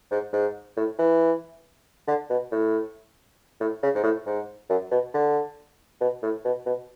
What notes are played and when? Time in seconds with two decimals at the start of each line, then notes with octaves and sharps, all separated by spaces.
0.11 G#2
0.33 G#2
0.77 A2
0.99 E3
2.07 D3
2.30 B2
2.52 A2
3.60 A2
3.83 C#3
3.95 G#2
4.04 A2
4.26 G#2
4.70 F#2
4.91 B2
5.14 D3
6.01 B2
6.23 A2
6.45 B2
6.66 B2